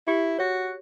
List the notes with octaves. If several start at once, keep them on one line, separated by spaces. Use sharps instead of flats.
E4 G4
F#4 C#5